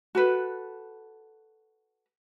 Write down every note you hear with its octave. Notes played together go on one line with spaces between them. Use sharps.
F#4 A4 B4